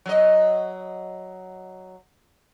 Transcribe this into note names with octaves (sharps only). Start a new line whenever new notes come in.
F#3 D#5